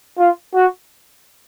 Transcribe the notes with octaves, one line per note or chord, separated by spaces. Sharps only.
F4
F#4